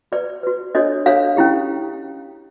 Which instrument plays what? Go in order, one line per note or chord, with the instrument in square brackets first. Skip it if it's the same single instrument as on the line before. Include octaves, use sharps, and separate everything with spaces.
[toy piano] F#4 B4 D5
F#4 B4
D4 F#4 A4 C#5 D#5
D4 F#4 A4 C#5 F5
C#4 E4 G4